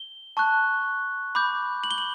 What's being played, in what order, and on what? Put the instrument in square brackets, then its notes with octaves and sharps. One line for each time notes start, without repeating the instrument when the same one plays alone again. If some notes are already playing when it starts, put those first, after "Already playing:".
Already playing: [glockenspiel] G7
A5 C#6 F#6
B5 D6 G6
F#7
G7
F#7